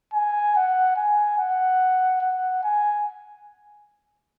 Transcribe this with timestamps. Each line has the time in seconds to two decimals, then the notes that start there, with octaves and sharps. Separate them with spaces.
0.14 G#5
0.56 F#5
0.97 G#5
1.38 F#5
2.22 F#5
2.63 G#5